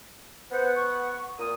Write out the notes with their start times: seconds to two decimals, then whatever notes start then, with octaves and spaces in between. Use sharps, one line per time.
0.51 B3 C5 F#5
0.76 C#6
1.39 A#2 D#6